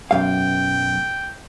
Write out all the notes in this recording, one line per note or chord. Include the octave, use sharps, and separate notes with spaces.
B1 F#2 F5 G5